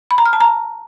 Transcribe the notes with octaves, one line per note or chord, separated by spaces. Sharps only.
B5
A#5
F6
A5
A#5